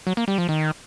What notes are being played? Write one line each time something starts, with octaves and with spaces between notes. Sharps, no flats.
F#3
A#3
G3
F3
D#3